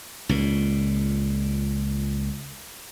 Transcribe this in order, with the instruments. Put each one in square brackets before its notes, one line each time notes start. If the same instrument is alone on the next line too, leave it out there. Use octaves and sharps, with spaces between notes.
[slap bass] C#2 A#2